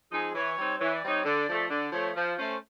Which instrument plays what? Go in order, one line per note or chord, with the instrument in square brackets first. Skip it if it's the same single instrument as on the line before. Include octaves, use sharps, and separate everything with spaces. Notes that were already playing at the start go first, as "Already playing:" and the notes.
[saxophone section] F3 G#3 C4 D#4 [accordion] G#4
[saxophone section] E3 [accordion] C#5
[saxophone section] G3 C4 D#4
[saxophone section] E3 [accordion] C#5
[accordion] D5
[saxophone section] G3 C4 D#4 [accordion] C#5
[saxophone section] D3 [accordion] D5
[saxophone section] F3 A3
[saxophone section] D3 [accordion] D5
[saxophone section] F3 A3 [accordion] C#5
[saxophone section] F3 [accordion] C5
[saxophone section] A3 C#4 [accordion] C5